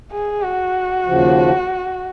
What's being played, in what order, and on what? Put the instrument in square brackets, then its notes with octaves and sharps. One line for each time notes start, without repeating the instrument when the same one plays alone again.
[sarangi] G#4
F#4
[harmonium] D#2 C#3 F3